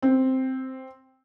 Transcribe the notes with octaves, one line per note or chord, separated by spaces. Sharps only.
C4